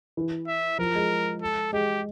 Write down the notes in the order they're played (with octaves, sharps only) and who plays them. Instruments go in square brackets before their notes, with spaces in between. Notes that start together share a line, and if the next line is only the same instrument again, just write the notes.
[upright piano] E3
[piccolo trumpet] E5
[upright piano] F3 [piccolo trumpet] A#4
[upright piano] G#3
[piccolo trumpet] A4
[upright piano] G#3 [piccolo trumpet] G4